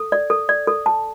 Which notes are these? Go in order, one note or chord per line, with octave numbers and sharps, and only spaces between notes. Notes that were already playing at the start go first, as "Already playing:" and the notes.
Already playing: A4
D5
A4
D5
A4
A5